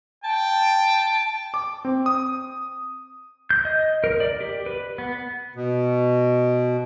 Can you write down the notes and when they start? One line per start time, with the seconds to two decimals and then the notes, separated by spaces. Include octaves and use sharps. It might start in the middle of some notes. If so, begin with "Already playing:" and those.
0.24 G5 A5
1.54 D6
1.85 C4
2.06 D#6
3.50 G6
3.65 D#5
4.04 A#4
4.20 D5
4.41 G4
4.66 B4
4.98 B3
5.56 B2